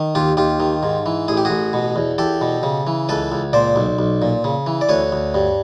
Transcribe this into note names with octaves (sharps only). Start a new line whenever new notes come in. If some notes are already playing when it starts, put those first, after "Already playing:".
Already playing: D#3
D#2 F4 G4
D#2 F4 G4
D#3
G#2
E3
A1 G#4
G4
A1 F#4 G#4
B2
E2
E2 G4 A4
B2
C#3
E3
C#2 A4 B4
C#2
A#2 C5 D5
B1
B1
A#2
C#3
E3
D5
D2 B4 C#5
D2
G2